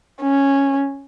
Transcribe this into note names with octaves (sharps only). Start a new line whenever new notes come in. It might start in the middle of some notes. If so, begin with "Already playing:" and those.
C#4